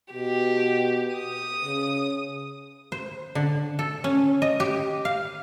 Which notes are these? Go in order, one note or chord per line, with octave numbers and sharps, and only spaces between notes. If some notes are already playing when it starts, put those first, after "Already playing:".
B2 G4
D#6
C#3
C5
D3
A4
C#4
D#5
G4
F5